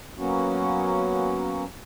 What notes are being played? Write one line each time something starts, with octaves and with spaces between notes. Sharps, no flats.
F#3 A#3 B3 C#4 F#4